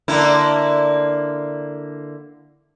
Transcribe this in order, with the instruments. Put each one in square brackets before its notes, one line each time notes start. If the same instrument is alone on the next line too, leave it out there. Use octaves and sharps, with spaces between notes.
[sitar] D3 A#3 E4